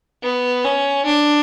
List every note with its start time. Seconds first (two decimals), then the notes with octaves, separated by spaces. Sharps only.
0.23 B3
0.64 C#4
1.05 D4